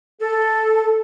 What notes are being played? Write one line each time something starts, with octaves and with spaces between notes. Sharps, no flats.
A4